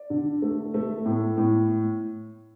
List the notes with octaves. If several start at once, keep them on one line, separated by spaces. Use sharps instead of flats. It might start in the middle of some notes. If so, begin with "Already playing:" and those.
Already playing: D5
D3
A3
A3
A2
A2